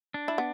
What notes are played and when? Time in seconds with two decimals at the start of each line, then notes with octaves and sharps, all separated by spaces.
0.14 D4
0.28 E4
0.38 B3